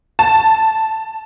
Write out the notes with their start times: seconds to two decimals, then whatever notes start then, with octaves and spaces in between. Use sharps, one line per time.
0.19 A5